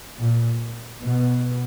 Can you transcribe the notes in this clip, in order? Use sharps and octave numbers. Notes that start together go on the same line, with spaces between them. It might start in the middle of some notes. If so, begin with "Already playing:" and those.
A#2
B2